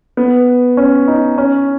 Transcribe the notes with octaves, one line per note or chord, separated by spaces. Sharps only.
B3
C#4
D#4
C#4